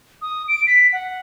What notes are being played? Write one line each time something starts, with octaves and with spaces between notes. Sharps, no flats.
D#6
D7
B6
F#5